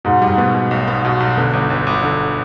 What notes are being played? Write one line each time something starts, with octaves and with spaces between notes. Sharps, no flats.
G#2 B2
G3
G#2
B2 B3
B2
B1
B3
B2
B1
B2 D3
G1
G1
G1
D3